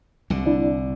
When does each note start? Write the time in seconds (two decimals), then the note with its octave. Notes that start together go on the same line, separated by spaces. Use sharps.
0.30 C2 D3
0.46 D4 E4 D5